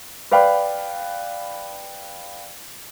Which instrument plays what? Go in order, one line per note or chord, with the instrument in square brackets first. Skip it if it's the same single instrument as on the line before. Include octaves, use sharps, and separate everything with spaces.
[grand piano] B4 D5 F5 G5 B5